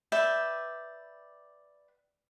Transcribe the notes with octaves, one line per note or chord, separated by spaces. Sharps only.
B4 D5 E5 G5